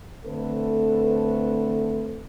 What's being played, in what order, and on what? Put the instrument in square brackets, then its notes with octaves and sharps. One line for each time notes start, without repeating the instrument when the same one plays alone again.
[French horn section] D3 A3 C4 A4 B4